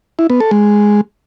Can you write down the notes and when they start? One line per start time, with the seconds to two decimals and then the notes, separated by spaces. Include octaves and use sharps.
0.19 E4
0.30 B3
0.40 A4
0.51 G#3